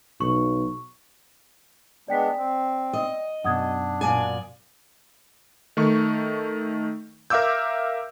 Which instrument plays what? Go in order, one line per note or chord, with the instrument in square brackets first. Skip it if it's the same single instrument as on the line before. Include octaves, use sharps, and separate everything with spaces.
[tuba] B1 [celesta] C#6
[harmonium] G#3 B3 D4 [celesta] D5 G5 B6
[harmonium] C4
[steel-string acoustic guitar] D#5
[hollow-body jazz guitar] F#2 B2 [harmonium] D4 [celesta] F#5 D#6 G#6
[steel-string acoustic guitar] A#2 D5 G#5
[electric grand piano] D#3 A3 C#6
A#4 E5 F5 D6 E6 G6